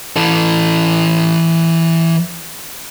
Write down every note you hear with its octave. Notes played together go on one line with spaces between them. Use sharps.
E3 A4